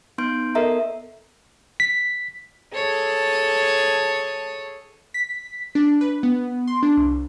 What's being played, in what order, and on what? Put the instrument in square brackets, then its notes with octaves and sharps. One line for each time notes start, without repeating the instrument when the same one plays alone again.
[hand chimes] B3 D#4 C6 G6 D7
B3 A4 A#4 D#5 E5 A#5
[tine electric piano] B6
[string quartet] G#4 A4 C#5 A5
[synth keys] B6
D4
B4
B3
C6
D4
C2